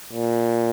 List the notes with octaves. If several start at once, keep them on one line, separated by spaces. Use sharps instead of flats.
A#2